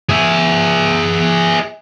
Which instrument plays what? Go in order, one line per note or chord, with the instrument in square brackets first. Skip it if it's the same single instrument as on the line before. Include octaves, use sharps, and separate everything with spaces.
[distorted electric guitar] G#4 E5